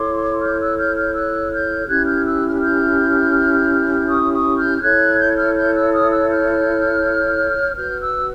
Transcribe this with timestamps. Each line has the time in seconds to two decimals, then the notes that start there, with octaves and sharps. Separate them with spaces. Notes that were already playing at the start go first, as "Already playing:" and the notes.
Already playing: E4 A4 C#5 C6 D6
0.40 F6 G6
0.59 E6 F#6
0.77 F6 G6
0.96 F6 G6
1.14 E6 F#6
1.51 F6 G6
1.88 C#4 E4 G4 F#6 G#6
2.06 F6 G6
2.25 E6 F#6
2.47 F6
2.54 F#6
2.61 F6 G6
4.08 C#6 D#6
4.33 C#6 D#6
4.57 F6 G6
4.77 G6
4.81 E4 A4 C#5 F#6 G#6
5.18 G6
5.27 G#6
5.37 F6 G6
5.55 F6 G6
5.74 E6 F#6
5.92 D#6 F6
6.11 E6 F#6
6.29 F6 G6
7.76 F#4 B4 F6 G6
8.00 E6 F#6